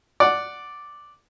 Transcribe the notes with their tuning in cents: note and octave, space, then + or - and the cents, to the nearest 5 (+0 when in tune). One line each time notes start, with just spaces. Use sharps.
D5 +0 F#5 +0